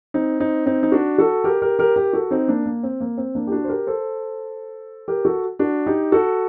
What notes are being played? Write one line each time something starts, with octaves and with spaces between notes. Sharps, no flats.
C4 D#4
C4 D#4
C4 D#4
D#4
D4 F#4
F#4 A4
G4 A#4
G4 A#4
G4 A#4
G4 A#4
F#4 A4
C4 D#4
A#3 D4
A#3
C4
A#3
C4
A#3 D4
G4
D4 F#4
C5
G4 A#4
A4 C5
G4 A#4
F#4 A4
D4 F#4
D#4 G4
F#4 A4